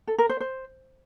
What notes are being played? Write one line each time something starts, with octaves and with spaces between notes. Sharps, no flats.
A4
A#4
C5
C5